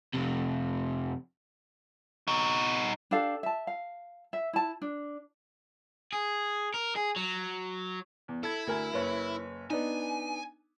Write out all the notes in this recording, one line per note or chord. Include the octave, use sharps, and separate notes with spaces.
F2 C3
D#4 F#4
D4 G4 A4 F5
E5 A5
F5
E5
E4 A5
D4
G#4
A#4
G#4
F#3
E2
E4 A4 G#6
D2 A#4 G#5
F#1 B4 C#5
B3 D4 D#4 G#5